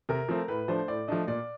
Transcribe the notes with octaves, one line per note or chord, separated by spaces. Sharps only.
C3 A#4
F3 A3 C4
A2 B4
F3 A3 D4 C5
A2 D5
F3 A3 D4 D#5
A#2 D5